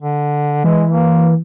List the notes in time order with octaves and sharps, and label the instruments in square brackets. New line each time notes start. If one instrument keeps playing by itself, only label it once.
[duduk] D3
[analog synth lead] E3 [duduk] G#3
[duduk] A#3